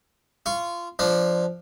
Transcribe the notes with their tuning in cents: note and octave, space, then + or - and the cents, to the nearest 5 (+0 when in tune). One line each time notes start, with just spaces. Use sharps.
F4 -20 C#6 +0
F3 -5 D4 +0